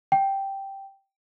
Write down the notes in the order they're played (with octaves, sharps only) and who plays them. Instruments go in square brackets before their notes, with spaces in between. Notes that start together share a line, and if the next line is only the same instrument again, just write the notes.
[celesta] G5